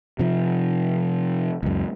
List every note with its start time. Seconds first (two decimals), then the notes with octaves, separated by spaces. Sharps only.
0.19 C3 F3
1.63 C#2 F#2